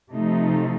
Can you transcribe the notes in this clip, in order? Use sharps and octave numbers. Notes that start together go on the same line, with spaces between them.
C3 F3 A3 D#4